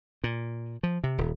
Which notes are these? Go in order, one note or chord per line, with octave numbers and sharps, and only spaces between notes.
A#2
F3
C3
D#1